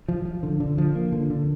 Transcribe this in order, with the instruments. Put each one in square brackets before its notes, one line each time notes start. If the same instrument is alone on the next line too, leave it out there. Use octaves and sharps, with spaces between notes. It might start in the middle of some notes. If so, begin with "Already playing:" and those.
[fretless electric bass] F3
F3
D3
D3
F3
A#3
D3
D3